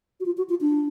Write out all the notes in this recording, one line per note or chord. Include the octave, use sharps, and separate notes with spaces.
F#4
F4
F#4
F4
D4